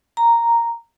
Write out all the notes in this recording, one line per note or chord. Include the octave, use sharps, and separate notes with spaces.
A#5